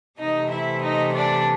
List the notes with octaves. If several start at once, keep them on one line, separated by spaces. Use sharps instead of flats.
C3 E3 A3 C4 D#4 D#5
E4 E5
D#4 D#5
D4 D5